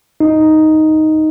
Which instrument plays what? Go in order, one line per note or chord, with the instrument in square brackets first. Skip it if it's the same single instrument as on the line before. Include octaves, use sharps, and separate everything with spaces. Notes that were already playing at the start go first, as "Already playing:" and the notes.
[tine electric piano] D#4